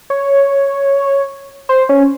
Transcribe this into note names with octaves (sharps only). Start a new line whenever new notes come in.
C#5
C5
C#4